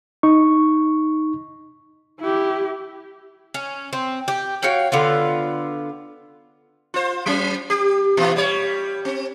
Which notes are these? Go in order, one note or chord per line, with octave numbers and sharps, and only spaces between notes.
D#4 C#6
E4 G4
C#4
C4
G4
F#4 C#5 F5 G5
D3 B3 F4
F4 C5
F#3 C#4
G4
A#2 E3 F4
G3 C#5
C4